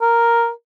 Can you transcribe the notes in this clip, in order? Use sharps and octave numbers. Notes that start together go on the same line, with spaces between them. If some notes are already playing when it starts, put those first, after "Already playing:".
A#4